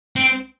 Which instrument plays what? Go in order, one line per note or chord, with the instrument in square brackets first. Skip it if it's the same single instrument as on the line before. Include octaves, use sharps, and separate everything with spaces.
[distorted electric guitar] C4